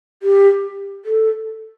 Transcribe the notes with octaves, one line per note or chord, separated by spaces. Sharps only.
G4
A4